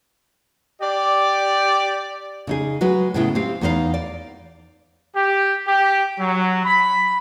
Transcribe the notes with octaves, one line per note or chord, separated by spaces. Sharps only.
G4 D5
C#3 D#4 G#4
F#3 G#3 F#4 B4
A2 C#3 G#3 B3 E4
C4 G4 F5
E2 B3 D#4 E5 F5
D5
G4
G4
F#3
B5